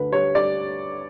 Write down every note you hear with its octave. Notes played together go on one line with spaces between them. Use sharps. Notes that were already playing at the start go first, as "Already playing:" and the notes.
Already playing: D2 D3 B4
G3 C#5
G3 D5